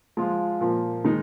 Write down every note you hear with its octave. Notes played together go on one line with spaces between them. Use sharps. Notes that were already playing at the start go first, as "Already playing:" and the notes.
F3 G#3 F4
A#2 F3 A#3
D#3 G#3 D#4